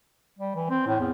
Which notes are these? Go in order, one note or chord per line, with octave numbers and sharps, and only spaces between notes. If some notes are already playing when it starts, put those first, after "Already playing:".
G3
E3
C4
A2
E2